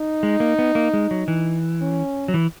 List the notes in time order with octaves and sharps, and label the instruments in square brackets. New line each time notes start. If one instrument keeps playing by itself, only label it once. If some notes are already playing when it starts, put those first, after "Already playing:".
Already playing: [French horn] D#4
[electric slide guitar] G#3
A#3
B3
A#3
G#3
F#3
E3
[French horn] C#4
[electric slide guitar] F#3
E3